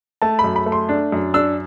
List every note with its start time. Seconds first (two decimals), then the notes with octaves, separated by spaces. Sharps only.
0.22 A3 A5
0.39 B5
0.44 F#2
0.56 B5
0.66 A3
0.72 C6
0.89 D4
1.12 F#2
1.34 D4 E6